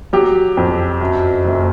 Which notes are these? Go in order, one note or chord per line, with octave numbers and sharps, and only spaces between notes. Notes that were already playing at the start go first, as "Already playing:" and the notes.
F#3 G4
F2
F#2
F#1